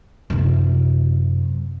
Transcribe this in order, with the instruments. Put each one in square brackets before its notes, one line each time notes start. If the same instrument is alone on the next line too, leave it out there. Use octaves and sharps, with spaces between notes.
[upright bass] F#2 C3